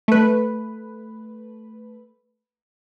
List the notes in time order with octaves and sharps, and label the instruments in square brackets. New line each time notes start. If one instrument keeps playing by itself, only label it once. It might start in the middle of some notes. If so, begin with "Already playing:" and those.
[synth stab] A3 B4